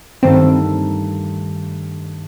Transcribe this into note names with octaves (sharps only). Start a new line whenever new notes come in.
G2 D#3 A3 C4